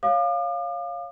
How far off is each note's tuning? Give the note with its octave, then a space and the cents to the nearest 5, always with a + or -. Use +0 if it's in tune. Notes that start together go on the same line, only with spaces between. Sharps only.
C#5 +0 F5 +0 D6 +45